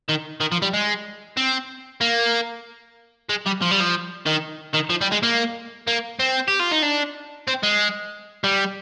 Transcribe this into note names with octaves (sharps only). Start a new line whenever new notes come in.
D#3
D#3
F3
G3
G#3
C4
A#3
G#3
G3
F3
G3
F3
D#3
D#3
F3
G3
G#3
A#3
A#3
C4
G4
F4
D#4
D4
C4
G#3
G3